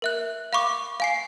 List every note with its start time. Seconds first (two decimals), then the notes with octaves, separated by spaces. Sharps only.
0.02 A#4 E5 F#6
0.53 F5 B5 C#6 D6
1.00 F5 G#5 C7